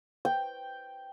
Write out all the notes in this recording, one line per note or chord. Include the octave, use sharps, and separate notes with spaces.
G5